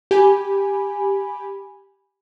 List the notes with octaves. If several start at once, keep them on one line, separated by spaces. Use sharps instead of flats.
G4 G#5 B5